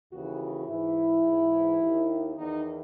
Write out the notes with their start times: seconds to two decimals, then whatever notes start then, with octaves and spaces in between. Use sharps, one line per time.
0.11 D#2 C#3 E3 F#4
0.39 F#4
0.67 G#2 E3 E4
1.23 G#2
1.28 E3
1.80 D#2 D#3
2.36 E2 D#3 D#4